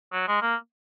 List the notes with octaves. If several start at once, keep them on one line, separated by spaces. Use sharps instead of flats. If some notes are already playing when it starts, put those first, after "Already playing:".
F#3
G#3
A#3